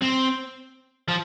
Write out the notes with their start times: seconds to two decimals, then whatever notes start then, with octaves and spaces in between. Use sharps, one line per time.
0.01 C4
1.08 F3